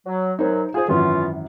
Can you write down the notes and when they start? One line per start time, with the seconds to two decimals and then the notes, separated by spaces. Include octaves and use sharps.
0.06 F#3
0.39 F#2 F#3 D#4 C5
0.74 F4 G#4 C5
0.88 G#1 F#2 E3 B3 C#4 F4